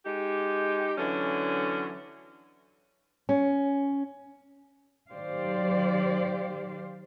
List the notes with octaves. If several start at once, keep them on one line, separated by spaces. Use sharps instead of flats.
G#3 D#4 G4
D3 E3 F#3 C#4
C#4
D#3 F#3 G4 C5 D5 F5